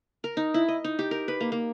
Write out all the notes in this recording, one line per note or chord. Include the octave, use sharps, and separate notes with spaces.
A#4
D#4
E4
D#5
D#4
G4
A#4
B4
A#3
A#3